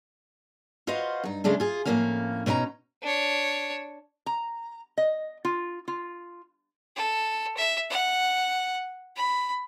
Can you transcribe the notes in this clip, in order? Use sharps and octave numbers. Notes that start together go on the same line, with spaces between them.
F4 F#4 B4 C5 D#5 F5
G2 D#4
C#3 G#3 A3 C#4 D4
F4 G#4
F2 A2 A3 A#3 C#4 F5
B2 C#4 D#4 D5 A#5
D4 C#5
A#5
D#5
F4
F4
A4
E5
F#5
B5